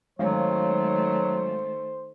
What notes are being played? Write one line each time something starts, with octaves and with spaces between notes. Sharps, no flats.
G#1 D#3 F#3 A3 C#4 C5